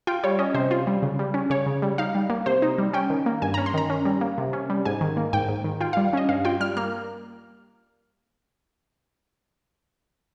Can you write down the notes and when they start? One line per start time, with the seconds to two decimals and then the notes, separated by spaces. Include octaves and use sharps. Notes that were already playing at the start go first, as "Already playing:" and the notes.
0.07 F4 G5
0.23 G3 C#5
0.39 C#4 D#5
0.54 C3 C5
0.71 F4
0.87 G3
1.03 C#3
1.19 G3
1.34 C#4
1.50 C#3 C#5
1.66 C#3
1.82 G3
1.98 D#4 F5
2.15 G3
2.30 A#3
2.46 C3 C5
2.62 D#4
2.78 G3
2.93 C#4 G5
3.10 D#3
3.26 A#3
3.42 G2 G#5
3.54 C#4 A#5
3.66 C6
3.74 D#3 A#5
3.90 C#4
4.05 G3
4.21 A#3
4.38 C3
4.53 C#4
4.70 G3
4.85 G#2 G#5
5.01 D#3
5.17 A#3
5.33 G#2 G5
5.49 G#2
5.64 D#3
5.80 F4 G5
5.93 G3 F5
6.13 C#4 D#5
6.29 G2 F5
6.45 F4 G5
6.60 G3 F6
6.77 A#3 F6